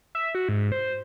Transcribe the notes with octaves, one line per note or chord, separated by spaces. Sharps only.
E5
F#4
G#2
C5